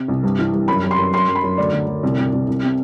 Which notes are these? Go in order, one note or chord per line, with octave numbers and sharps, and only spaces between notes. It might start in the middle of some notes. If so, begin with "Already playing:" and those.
Already playing: C3
C2
G2
E3
G2
F#2 B5
F#2
C6
F#2
F#2 C6
F#2
B5
F#2
D2 D5
D2
D2
C2
C2
C2
C2
C3